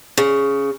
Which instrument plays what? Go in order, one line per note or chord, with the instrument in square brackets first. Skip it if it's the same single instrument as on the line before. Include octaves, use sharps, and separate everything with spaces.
[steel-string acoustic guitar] C#3